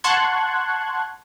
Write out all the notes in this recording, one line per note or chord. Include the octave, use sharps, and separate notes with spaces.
F#5 A5 C6 C#6 F#6 G#6